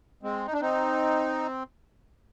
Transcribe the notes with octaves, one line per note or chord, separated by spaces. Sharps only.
G#3 C4
D#4
D4
C4 D#4